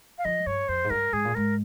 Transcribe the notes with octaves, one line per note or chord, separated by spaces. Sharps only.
F5
F3 D#5
G2 C#5
F2 C5
G#2
G2 A#4
G#2 G#4
A#2
G#2 A#4